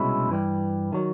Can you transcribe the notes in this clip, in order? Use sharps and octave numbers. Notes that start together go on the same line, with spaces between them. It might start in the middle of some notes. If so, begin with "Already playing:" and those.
Already playing: C2 B2 G#3 C#4 E4
G2 E3 G3
D#3 F#3